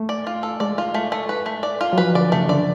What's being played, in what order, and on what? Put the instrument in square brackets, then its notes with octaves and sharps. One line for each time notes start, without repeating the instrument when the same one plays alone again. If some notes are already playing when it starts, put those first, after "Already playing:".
Already playing: [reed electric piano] A3
[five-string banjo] D5
F4
A4
[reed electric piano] G#3 [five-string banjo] D5
[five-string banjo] F4
A3
A3
B4
A3
D5
F4
[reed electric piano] F#3
[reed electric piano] F3 [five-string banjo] B4
[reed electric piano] D3 [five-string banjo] D5
[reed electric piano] C#3 [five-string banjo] A3
[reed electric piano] D3 [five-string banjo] D5